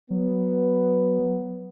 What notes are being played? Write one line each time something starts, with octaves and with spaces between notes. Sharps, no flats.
F#3 B3